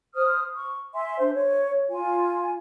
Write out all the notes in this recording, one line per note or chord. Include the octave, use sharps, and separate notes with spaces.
C5 D#6 F6
C#6
E5 G#5 C6
D4 C5
C#5
F4 G#5